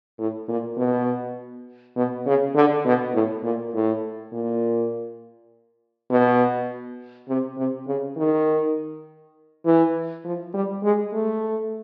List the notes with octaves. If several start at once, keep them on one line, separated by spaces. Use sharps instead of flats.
A2
A#2
B2
B2
C#3
D3
B2
A2
A#2
A2
A#2
B2
C3
C3
C#3
D#3
E3
F3
G3
G#3
A3